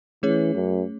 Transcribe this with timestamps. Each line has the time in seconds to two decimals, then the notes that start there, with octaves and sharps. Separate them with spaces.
0.23 E3 A3 C#4 G#4 C#5
0.55 F#2